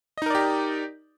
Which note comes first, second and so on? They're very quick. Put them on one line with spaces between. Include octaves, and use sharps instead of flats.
D#5 D#4 A#4 D5 G4